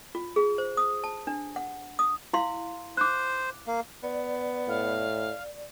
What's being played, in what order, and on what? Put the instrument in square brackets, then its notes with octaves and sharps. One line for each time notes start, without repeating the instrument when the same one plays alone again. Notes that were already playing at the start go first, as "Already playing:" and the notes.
[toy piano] F4
G#4
C5
D#6
A5
D4
F#5
D#6
E4 F5 C6
[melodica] C5 [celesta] D6 F#6
[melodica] A#3
[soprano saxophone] B3 [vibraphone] D5
[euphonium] A2 [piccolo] F5